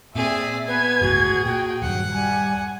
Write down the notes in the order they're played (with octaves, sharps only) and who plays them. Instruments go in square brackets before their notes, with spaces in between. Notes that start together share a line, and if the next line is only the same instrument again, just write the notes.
[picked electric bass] A#2 [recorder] C4 [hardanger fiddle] G#4 D5 [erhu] E5
[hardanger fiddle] B3 G#5 [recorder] B4 [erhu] G#6
[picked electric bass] G1 C#2 A2 [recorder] F#4 [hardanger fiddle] G#4
[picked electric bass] A#2 [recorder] F#4 [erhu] G5
[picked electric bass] D#1 G2 [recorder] F#3 [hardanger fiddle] F#5
[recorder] G3 [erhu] G#5